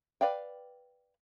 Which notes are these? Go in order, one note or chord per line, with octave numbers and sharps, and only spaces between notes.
B4 D5 F5 G5